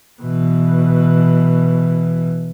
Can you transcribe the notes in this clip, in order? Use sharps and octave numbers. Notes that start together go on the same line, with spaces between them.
B2 E3